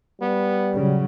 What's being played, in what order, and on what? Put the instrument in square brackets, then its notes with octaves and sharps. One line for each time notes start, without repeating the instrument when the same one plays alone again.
[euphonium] G3 [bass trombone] B3
[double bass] C#3 F#3